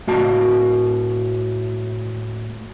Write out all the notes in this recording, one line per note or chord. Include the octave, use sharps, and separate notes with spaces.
A2 F#4 A5